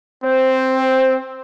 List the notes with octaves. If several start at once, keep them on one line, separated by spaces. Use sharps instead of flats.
C4 C5